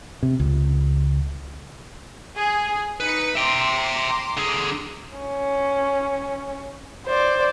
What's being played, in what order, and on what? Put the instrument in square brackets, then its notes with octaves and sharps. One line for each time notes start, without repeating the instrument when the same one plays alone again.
[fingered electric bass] C3
C#2
[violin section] G#4
[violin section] D#4 C#7 [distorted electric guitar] B4
[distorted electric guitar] E5 G5 [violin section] A#5 C6 D6
[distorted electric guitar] D3 G#4
[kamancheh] C#4
C5 D5